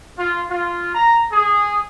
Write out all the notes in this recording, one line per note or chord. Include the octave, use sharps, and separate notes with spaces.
F4
F4
A#5
G#4